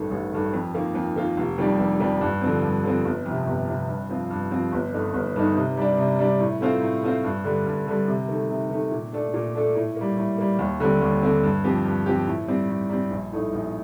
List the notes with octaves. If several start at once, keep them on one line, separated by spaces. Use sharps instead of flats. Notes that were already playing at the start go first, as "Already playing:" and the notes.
Already playing: A1 G2 D#3 A3
A1
G2 D#3 A3
F2
D#3 A#3 F4
F2
D#3 A#3 F4
F1
F2 D#3 G3 D4
F1
F2 D#3 G3 D4
G2
D3 F3 C4
G2
D3 F3 C4
G1
F2 C3
G1
F2 C3
G2
F3 C4 F4
G2
F3 C4 F4
G1
G2 D#3 A3 D#4
G1
G2 D#3 A3 D#4
C3
G3 D4
C3
G3 D4
A2
A3 C4 F4 C5
A2
A3 C4 F4 C5
G2
D3 G3
G2
D3 G3
C3
D#3 A3
C3
D#3 A3
A#2
A3 D4 A4
A#2
A3 D4 A4
A2
G3 A#3
A2
G3 A#3
D#2
D3 G3 C4
D#2
D3 G3 C4
G2
F3 C4 G4
G2
F3 C4 G4
A2
G3 C4
A2
G3 C4
A#1
A2 A3 D#4
A#1